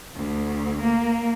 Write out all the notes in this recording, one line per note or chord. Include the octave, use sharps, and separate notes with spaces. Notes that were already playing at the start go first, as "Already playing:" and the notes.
D2
A#3